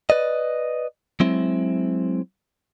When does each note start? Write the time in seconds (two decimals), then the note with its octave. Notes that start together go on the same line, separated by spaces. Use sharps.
0.10 B4 D5 D#5
1.20 F#3 G#3 C4 E4